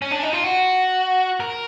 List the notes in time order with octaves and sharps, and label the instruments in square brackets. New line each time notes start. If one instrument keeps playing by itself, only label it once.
[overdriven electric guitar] C#4
D4
D#4
F4
F#4
A#4